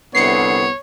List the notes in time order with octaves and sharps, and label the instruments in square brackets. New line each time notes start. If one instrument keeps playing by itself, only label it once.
[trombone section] C2 D3 [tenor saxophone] B3 [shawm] C#5 [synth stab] C7 C#7